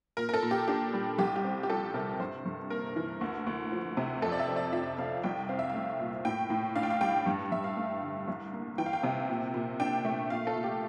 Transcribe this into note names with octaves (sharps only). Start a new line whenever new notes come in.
A#2 A#4
A#4
A4
A#2
G4
D4 G4
G3
C2 G4
G4
C4
G4
F3 A4
C3 A#4
G2 C5
G2
A#3 A#4
E3
D2
D2
F3
C3
F2 A4
D5
E5
C4
D5
F3 E5
C3 F5
C2 G5
C4 F5
E5
F5
A3
A#2
A2 G5
A2
D4 F5
G5
F5
G3 G5
G2
G2 E5
F5
A3
D3
C2
A#3
E3 G5
F5
G5
C3
A#2
A#2
D4 G5
A3
A#2 F5
A4
A#2
G4